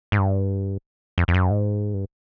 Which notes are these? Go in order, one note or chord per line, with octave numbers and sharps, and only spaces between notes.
G#2
G2
F2
F2
F#2
G#2
G2